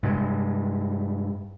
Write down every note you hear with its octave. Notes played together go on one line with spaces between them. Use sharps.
G2 C3 G#3